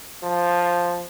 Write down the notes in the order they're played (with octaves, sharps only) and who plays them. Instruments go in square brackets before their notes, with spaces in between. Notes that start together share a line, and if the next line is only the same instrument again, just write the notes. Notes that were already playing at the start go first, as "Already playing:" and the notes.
[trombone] F3